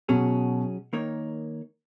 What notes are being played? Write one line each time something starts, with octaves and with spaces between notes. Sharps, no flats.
B2 F#3 C#4 G#4
D#3 A#3 D#4 A#4 C#5